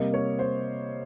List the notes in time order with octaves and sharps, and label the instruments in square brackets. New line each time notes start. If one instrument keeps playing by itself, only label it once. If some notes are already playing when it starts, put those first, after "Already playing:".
Already playing: [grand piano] C3 G3 A#3 D#5
C#5
C5